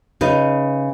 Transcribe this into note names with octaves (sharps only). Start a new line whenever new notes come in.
C#3 D#4 B4